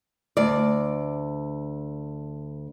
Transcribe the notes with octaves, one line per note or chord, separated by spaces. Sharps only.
D2 D5